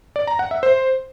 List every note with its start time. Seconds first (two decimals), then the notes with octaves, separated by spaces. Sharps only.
0.16 D5
0.27 A#5
0.39 F#5
0.51 E5
0.63 C5